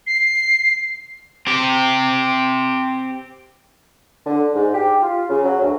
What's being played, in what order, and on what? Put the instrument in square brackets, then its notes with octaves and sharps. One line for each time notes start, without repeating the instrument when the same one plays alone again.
[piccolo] C7
[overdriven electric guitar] C4 G4
[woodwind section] D3
G#2
G4
F4
C#3
F#3
D2